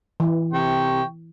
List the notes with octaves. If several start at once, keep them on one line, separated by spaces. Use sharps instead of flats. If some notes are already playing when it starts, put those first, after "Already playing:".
E3
C3 G5 C#6